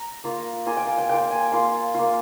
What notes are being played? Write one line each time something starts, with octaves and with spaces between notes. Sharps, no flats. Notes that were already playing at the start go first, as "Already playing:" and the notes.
Already playing: A#5
A#3 F4
A#3 F4 G#5
G5
G#5
G5
A#3 F4 G5
G#5
A#3 F4 C6
A#3 F4